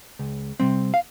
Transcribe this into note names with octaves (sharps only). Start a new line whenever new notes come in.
C#2
C3 G3 C4
F5